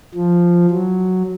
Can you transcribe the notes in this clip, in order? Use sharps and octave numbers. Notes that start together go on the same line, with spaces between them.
F3
F#3